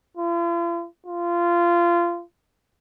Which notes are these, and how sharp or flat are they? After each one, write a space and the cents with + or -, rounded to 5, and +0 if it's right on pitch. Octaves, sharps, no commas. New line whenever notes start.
F4 -45
F4 -20